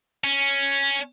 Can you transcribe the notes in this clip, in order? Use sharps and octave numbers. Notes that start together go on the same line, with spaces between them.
C#4